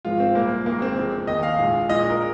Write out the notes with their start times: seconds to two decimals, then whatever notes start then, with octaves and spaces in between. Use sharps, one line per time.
0.05 G#1 G#2 F3 G#3 F4
0.20 C4
0.35 C2 A#2 G#3 A#3
0.66 G#1 G#2 G#3 A#3
0.82 C4
0.97 F2 C3 G#3
1.27 F1 D#2 D#3 D#5
1.43 F5
1.58 A#1 A#2 G#3 F5
1.89 A#1 A#2 G#3 D#5
2.10 A#4